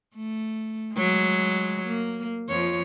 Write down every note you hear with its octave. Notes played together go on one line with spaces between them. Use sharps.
A3
F#3 G#3
A#3
F2 F3 C#5